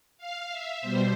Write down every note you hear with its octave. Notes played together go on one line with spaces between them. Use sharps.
F5
E5
B2 G3 C5